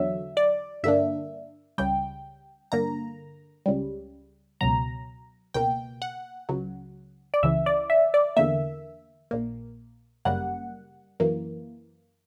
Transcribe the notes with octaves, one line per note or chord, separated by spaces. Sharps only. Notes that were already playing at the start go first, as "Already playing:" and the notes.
Already playing: E2 D3 F#3 E5
D5
G2 D3 A#3 D4 E5
C#2 C#3 G3 G5
G2 D3 A#3 A#5
C#2 C#3 G3
C#2 B2 F#3 A#5
C#2 B2 A#3 G5
F#5
C#2 C#3 F#3
D5
C#2 C#3 E3 E5
D5
E5
D5
E2 D3 A#3 E5
A#1 A#2 A#3
G1 F#2 C#3 G3 A#3 F#5
F#2 E3 A#3